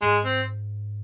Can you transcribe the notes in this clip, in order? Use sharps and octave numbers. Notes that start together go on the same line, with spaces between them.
G#2 G#3
C4